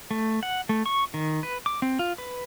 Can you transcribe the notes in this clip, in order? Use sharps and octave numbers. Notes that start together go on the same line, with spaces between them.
A3
F#5
A3
C#6
D#3
B4
D6
C4
F4
B4